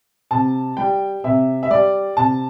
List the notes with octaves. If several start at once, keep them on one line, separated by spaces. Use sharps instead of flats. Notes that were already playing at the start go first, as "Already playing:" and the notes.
C3 A5
G3 G5
C3 E5
E5
G3 D5
C3 A5